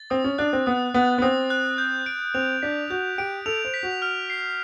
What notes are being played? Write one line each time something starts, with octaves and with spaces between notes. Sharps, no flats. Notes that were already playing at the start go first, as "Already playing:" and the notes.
Already playing: A6
C4 D#6
C#4
D4 F#6
C4
B3 D#6
B3 A6
B3
C4 D#6
F#6
G6
D7
C4 F7
D4 B6
F#4 G6
G4 D7
A4 F7
C5
B6
F#4
F6
C7